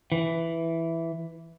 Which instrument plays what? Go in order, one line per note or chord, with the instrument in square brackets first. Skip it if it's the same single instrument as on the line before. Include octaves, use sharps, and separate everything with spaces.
[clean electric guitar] E3